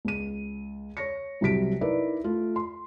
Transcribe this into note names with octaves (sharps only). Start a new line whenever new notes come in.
C#2 D#7
C#5 A#6 C#7
C2 C3 F#3 B6 D7
D#4 E4 A#4 B4 D5
A3 F4
C6